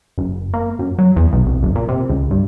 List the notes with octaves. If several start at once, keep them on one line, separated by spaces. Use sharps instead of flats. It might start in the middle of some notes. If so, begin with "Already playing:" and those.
F#1
A#3
F#2
F#3
E2
B1
C2
F#1
A#2
C3
C#2
G2